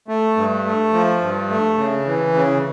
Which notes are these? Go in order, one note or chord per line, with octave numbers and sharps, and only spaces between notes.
A3
G2
A3
F3
G2
A3
C#3
E3
C#3